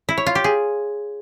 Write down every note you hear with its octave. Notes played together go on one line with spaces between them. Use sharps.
E4
C#5
F4
G4
G#4